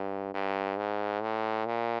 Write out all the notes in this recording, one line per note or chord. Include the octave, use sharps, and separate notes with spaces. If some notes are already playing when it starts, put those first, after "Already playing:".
Already playing: G2
G2
G#2
A2
A#2